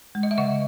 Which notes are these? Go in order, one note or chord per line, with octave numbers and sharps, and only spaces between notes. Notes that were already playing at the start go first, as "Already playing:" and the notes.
G#3
D#5
E5
C#3 D#5 F#5